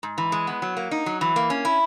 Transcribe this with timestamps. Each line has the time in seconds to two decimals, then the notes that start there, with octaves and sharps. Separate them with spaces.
0.03 G#2
0.18 E3
0.32 G#3
0.47 B3
0.62 F#3
0.77 A#3
0.91 D#4
1.06 F#3
1.21 E3
1.36 A#3
1.50 C#4
1.65 E4